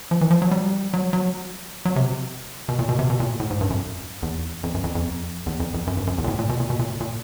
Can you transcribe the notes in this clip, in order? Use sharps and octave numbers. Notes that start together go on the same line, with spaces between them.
F3
E3
F3
F#3
G3
F#3
F#3
F#3
C3
B2
A#2
B2
C3
B2
A#2
A2
G#2
G2
F#2
E2
F2
F#2
F2
F2
E2
F2
F2
F#2
G2
F#2
E2
A#2
A2
A#2
B2
A#2
B2
A#2
A#2